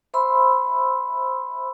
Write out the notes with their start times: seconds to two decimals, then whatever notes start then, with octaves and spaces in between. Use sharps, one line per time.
0.14 C5 E5 B5 C6 E6